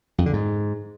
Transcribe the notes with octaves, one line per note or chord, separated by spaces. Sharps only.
F2
D3
G#2